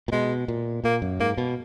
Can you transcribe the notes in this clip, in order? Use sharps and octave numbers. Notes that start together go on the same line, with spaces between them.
A#2
B2 G#3
A#2
A#2 A#3
F#2
G#2 A#3
B2